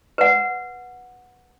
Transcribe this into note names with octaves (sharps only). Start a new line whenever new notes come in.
B4 F#5